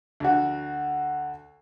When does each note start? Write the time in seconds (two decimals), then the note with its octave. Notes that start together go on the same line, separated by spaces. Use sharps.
0.20 D2 F#4